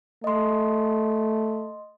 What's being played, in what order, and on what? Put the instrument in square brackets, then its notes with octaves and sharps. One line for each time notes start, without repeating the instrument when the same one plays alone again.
[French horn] A3 [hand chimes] D#5 C6